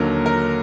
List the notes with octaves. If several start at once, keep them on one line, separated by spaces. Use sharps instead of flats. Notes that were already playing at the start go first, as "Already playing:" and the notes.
Already playing: D#2 D3 F#3 A#4
A#4